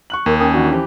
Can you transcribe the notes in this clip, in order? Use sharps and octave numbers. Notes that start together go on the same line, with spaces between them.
C#6 F#6 F#7
D#2 A#4
D#3 C#4 G#5 D#6
D#3 E3 D4 F#4
E3 F3 G4